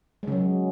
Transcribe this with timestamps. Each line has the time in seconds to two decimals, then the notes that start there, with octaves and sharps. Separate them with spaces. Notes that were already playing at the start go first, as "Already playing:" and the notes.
0.23 G#3
0.27 C#3
0.32 F#3